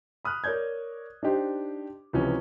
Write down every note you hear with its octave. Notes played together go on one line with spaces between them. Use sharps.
B5 D#6 F6 F#6
A#4 C#5 D5 G6 G#6
D4 D#4 G4 C5
C#2 C3 E3 F3 C#4